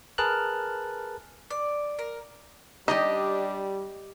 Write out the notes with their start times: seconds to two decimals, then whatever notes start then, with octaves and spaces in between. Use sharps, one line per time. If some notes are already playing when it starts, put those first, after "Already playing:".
0.18 G#4 A#4 B4 A5 F6 F#6
1.51 D5
1.99 A#4
2.88 G3 D4 D#4 G4 D#5 A5